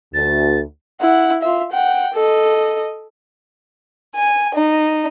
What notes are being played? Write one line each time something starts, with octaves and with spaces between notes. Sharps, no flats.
D2 A6
E4 F#5
F4 E5
F#5 G5
A4 D#5
G#5
D#4